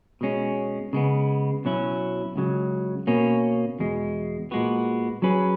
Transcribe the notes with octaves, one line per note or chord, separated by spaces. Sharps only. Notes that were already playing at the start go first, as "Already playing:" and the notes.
B2 G#3 C#4
C#3 G#3 B3
B2 F#3 C#4 E4
C#2 C#3 F#3
B2 A#3 C#4
E2 B2 G#3
A#2 G#3 B3 F#4
F#3 C#4 G#4 B4